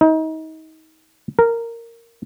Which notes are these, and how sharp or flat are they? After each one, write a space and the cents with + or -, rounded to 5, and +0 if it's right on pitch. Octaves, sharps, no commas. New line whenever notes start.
D#4 +30
A#4 -10